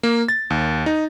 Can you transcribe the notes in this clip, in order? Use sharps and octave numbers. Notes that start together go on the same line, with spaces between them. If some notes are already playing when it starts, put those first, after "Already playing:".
A#3
A6
D#2
D#4